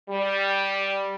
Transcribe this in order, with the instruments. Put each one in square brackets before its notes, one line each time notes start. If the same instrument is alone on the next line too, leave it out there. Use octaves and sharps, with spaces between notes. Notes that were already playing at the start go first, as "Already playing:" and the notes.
[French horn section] G3